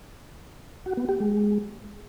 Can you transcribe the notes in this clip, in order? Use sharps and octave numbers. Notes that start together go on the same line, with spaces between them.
F#4
B3
G4
G#3